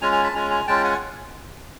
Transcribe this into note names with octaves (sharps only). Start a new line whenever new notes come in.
G#3 C#4 F4 G#5 A#5
G#5 A#5
A5 B5
G#3 C#4 F4 G#5 A#5
G#5 A#5
G#3 C#4 F4 G5 A5
F#5 G#5